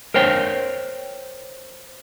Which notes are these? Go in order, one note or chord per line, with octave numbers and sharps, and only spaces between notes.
A#4 C5 C#5 G5